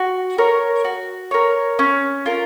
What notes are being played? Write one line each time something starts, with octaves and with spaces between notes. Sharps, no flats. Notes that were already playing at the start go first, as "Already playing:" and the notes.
Already playing: F#4
A#4 C#5
F#4
A#4 C#5
C#4
F4 A#4